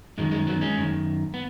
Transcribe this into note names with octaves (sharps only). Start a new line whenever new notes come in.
F#2 D#3 G#3
G#3
F#3 B3
G#3 C#4
F#2 D#3
B3